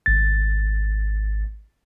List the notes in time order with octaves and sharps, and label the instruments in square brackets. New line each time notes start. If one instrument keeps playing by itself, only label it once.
[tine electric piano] G#1 A6